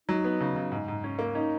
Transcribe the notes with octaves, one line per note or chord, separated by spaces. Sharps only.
F#3 D#4
B3
C#3
C#3
G#2
G#2
C#4
A#3
C#4 D#4